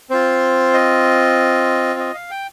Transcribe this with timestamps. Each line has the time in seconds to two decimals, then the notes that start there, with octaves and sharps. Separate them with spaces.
0.10 C4 F4 C5
0.74 D#5
2.00 D#5
2.14 F5
2.31 G5